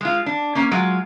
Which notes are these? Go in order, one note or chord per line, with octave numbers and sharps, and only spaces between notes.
G#3 F4
D4
A#3 C#4
F#3 G#3 F4